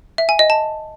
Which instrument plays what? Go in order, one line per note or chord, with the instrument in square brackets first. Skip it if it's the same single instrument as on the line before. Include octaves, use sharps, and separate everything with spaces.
[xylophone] E5
G#5
D#5
A5